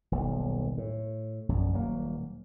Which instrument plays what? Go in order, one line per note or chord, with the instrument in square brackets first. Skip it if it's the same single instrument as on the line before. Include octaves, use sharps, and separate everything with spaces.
[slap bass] D#1 B1
A2
A#1 F#2
D#1 F#3 A#3